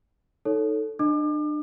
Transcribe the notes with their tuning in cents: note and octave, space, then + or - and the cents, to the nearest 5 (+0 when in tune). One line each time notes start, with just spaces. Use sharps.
D#4 +0 A4 +0 C#5 +10
D4 +35 D#5 -15 D6 +35